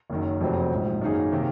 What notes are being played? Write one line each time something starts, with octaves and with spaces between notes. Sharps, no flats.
F#1 F#2 D#3
F1 F2 C3 F#3 C4
A#1 G#2 F3
F#2 D#3 A#3 D#4 G#4
C3 D#3 A#3